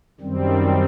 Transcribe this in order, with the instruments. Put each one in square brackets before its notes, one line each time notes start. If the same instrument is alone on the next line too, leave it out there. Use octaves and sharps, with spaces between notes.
[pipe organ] F#2 D#3 G3 C4